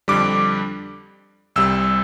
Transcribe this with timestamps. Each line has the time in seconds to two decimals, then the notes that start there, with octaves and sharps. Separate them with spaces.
0.08 F2 D3 G3 D6
1.56 C2 C3 G3 E6